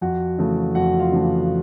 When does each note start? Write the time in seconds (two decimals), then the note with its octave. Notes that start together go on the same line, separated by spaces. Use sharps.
0.01 F2 F#4 F#5
0.39 C#3 E3 A3
0.75 F2 F#4 F#5
1.00 F4 F5
1.12 C#3 E3 A3